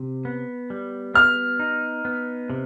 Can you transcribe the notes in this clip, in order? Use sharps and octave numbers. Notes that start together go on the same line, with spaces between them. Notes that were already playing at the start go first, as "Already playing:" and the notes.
Already playing: C3
B3
G3
B3 F6
D#4
B3
C3